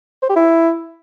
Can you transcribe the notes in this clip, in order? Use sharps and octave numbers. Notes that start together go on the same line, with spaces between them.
C5
G4
E4